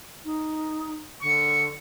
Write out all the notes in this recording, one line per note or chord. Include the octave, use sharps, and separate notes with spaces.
D#4
D3 C#6